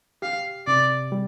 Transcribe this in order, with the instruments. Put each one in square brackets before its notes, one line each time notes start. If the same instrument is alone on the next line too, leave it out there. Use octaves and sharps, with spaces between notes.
[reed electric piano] G4 [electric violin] F5
[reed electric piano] C3 [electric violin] D5
[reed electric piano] G3